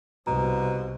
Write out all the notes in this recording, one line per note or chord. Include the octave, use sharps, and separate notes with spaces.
C2 B2 A#5